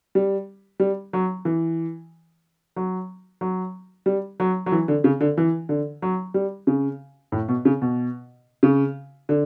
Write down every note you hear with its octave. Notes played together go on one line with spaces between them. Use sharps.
G3
G3
F#3
E3
F#3
F#3
G3
F#3
F#3
E3
D3
C#3
D3
E3
D3
F#3
G3
C#3
A2
B2
C#3
B2
C#3
D3